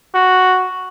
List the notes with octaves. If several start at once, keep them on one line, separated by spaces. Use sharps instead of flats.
F#4